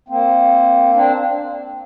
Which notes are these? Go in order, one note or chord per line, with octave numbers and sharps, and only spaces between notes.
A#3 C4
C4 D4